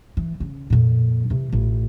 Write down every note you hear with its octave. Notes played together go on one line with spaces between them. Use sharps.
E3
C#3
F2 A#2
C3 E3
A1 F4